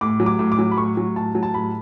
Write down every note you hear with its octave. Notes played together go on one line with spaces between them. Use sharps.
A2 D6
F#3
D6
A2
D6
F#3
B5
A2 C#6
F#3
A2 A5
F#3
A5
A2 B5